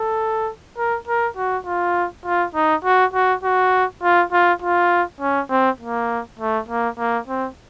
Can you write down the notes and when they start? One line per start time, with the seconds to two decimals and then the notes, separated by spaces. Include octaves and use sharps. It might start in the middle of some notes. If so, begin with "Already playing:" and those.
Already playing: A4
0.77 A#4
1.07 A#4
1.37 F#4
1.66 F4
2.25 F4
2.55 D#4
2.85 F#4
3.14 F#4
3.43 F#4
4.03 F4
4.32 F4
4.62 F4
5.21 C#4
5.50 C4
5.80 A#3
6.39 A3
6.68 A#3
6.98 A#3
7.28 C4